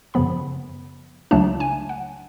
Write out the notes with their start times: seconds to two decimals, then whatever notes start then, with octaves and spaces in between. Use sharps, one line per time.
0.14 F#2 C#3 F3 B3 B5
1.31 C#2 C#3 F#3 A3 D4 A5
1.60 G#5
1.89 F#5